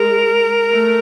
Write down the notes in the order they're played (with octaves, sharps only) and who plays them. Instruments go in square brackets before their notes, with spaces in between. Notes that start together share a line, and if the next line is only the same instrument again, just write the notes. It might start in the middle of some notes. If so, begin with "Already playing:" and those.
Already playing: [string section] G#3 [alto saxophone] A#4
[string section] A3